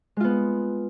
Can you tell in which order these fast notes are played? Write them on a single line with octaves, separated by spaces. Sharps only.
G#3 F4 B3